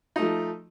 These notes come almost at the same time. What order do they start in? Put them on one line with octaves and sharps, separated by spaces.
D#4 A3 F3